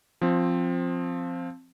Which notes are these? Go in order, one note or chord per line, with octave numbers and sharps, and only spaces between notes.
F3 C4